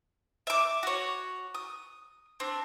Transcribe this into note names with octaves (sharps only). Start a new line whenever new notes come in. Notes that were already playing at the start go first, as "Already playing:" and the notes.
E5 D6
F#4 C#5
D#6
C4 D4